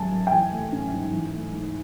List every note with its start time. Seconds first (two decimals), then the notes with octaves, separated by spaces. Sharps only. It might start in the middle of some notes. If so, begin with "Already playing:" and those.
Already playing: F#2 D#3 G#3 G#5 A5
0.11 F#2
0.27 G5
0.31 E3 G#5
0.52 A3
0.72 C#4
0.93 G#2
1.13 E3
1.33 A3
1.53 G#2